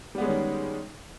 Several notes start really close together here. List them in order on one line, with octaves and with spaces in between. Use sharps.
G3 B3 G#3 C#4 D#3